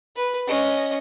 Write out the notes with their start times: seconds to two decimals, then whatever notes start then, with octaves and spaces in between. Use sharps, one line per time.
0.16 B4
0.47 C#4 D#5